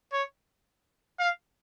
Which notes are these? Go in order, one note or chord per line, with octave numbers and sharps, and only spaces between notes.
C#5
F5